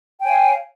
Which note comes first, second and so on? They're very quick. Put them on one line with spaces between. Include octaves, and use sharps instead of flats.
G5 G#5 C#5 F5